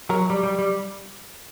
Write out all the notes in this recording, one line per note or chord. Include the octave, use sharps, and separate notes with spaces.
F#3 A#4
G3
G3
G3